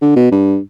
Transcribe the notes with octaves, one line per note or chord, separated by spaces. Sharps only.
D3
B2
G2